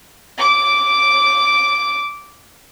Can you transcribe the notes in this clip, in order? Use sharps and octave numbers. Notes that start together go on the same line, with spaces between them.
D6 D7